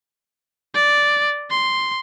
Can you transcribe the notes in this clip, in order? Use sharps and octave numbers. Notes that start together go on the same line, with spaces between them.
D5
C6